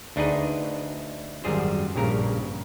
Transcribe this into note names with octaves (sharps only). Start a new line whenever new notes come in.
D2 D4 D#4 G#4 B4 D#5
G#1 F#2 G3 G#4 C5
A#1 G2 C#3 A#4